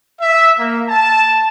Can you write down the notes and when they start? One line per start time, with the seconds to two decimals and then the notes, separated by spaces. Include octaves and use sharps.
0.21 E5
0.58 A#3
0.89 A5